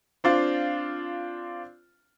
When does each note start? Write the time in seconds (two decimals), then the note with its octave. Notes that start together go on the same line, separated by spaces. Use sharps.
0.24 C4 D4 F4 F5